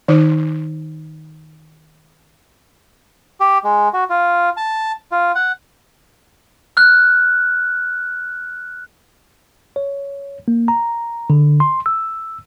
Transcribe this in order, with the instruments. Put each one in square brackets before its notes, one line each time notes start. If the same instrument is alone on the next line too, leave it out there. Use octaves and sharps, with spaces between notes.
[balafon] D#3 D#4 C5
[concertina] G4
G#3
F#4
F4
A5
F4
F#5
[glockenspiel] F6 F#6
[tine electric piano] C#5
A#3
A#5
D3
C6
E6